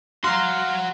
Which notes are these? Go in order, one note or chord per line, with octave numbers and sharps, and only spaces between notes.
F#4 F5 A#5 C6